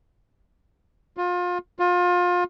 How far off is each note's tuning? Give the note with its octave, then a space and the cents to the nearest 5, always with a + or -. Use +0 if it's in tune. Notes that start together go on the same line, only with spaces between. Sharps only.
F4 +30
F4 +30